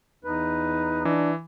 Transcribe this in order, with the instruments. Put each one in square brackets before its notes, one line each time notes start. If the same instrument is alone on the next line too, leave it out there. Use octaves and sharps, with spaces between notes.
[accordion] E2 B4 [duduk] D#4
[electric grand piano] E3 [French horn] D4